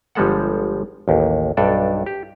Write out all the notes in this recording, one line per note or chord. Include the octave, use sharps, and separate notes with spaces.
G1 F3 G3 G#3 A4 F#5
A1 D#2
B1 G2 D4 A4 D5
G4